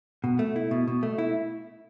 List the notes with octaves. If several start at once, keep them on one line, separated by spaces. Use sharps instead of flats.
B2
A3
E4
B2
B2
A3
E4